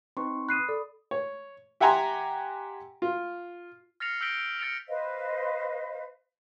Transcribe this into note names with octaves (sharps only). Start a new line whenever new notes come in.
C4 D#4 B4 C6 C#6
B5 D#6 F#6 C7 D#7
A4 D5
C#5
G4 E5 F#5 G#5 A#5 C6
F4
F6 A6 A#6 C7 C#7 F7
E6 G6 A#6 B6 D7 G7
D7 F7
F6 A6 C#7 D7 F7
B4 C5 D#5 F5